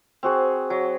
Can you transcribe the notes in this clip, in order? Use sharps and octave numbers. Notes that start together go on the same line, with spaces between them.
C4 F#4 G#4
F#3